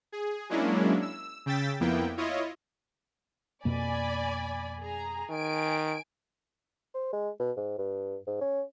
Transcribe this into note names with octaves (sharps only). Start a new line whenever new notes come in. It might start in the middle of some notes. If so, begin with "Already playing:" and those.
G#4
F#3 G#3 A#3 C#4 D4 E4
E6
C#3 G5 E6 A6 B6
F2 A#3 B3 E4 G5
E4 F4 C#5 D#5
F2 B2 A#3 D5 G#5 B5
G#4 A#5
D#3 G#5 D7
C5
G#3
B2
G#2
G2
G#2
C#4